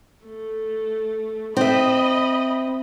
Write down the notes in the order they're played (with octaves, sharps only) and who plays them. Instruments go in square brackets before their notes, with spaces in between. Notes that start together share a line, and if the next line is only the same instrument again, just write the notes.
[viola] A3
[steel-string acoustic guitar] C4 E5 [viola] D#5 B5